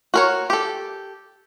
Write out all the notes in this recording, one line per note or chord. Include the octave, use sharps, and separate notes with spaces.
F#4 A#4 C#5
G4 A4